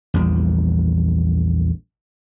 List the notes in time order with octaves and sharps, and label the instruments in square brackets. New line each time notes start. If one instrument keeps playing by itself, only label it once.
[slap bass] A#1 E2 G3